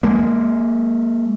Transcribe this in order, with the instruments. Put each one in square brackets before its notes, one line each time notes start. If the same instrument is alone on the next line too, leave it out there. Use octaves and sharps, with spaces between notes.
[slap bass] G#3 A#3